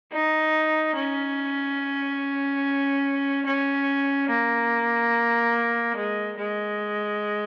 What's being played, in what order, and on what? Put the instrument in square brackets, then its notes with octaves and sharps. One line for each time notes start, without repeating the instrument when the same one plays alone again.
[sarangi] D#4
C#4
C#4
A#3
G#3
G#3